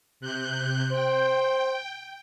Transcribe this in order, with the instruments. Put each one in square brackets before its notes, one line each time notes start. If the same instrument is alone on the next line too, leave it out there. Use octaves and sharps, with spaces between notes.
[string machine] C3 F#6 G6
[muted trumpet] C5 [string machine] G5